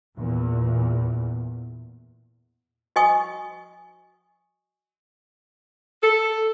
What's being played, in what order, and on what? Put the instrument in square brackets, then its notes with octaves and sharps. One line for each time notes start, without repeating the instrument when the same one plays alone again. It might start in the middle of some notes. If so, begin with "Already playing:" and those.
[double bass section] E2 A#2
[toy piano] F#4 D#5 G#5 C#6 D#6
[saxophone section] A4